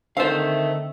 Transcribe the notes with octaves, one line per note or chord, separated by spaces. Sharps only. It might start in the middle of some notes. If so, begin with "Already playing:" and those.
D3 D#3 A3 C4 C5 F5